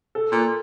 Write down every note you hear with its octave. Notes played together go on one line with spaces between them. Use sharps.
A4
A#2